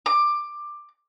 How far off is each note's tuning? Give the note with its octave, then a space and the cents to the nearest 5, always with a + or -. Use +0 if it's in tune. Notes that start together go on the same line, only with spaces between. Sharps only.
D6 +15